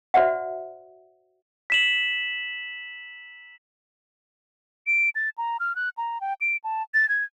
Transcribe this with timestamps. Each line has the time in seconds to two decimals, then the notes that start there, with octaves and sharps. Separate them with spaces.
0.14 F#4 C5 D5 E5 F#5
1.70 B6 E7 F#7
4.87 D7
5.15 A6
5.38 A#5
5.60 F6
5.76 F#6
5.97 A#5
6.21 G5
6.41 D7
6.64 A5
6.94 A6
7.09 G#6